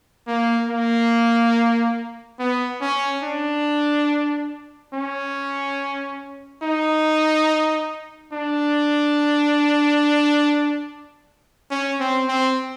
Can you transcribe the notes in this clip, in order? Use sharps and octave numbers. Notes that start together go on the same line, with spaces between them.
A#3
A#3
B3
C#4
D4
C#4
D#4
D4
C#4
C4
C4